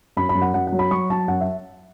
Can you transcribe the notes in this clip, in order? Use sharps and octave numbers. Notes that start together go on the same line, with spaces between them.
F#2 B5
B5
F#2
F#5
F#2 F#5
F#5
F#3
B5
F#3 C#6
F#3 A5
F#2 F#5
E5